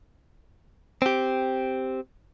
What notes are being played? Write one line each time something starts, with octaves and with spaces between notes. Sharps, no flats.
C4 G4